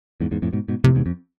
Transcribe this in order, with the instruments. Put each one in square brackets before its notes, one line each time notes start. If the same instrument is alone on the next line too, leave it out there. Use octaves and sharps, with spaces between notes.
[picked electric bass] E2 G#2
E2 G#2
F2 A2
G#2 B2
G#2 B2
[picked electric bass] F2 A2 [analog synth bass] C3
[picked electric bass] E2 G#2
F2